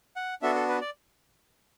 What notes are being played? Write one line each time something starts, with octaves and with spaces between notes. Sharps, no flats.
F#5
B3 D4 F#4 A4 E5
A4
B4
D5